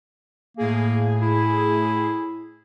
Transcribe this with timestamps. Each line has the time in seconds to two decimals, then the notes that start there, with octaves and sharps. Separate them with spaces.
0.57 A2 A#3 G#4
1.21 E4